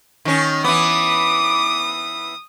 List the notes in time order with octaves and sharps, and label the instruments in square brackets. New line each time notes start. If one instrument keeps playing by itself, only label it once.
[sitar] D#3 C#4
[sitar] E3 B3 [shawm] D6 [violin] D#6